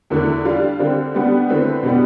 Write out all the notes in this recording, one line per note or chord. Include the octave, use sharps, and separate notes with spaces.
E2 D3 A3 E4
G3 D4 F4
D3 G3 C4
G3 B3 D4 G4
D3 A3 C4 E4 B4
B2 G3 B3 D4 G4